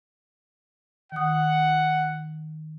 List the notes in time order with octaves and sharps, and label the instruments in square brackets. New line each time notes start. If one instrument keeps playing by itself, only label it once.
[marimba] D#3 D#6 [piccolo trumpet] F#5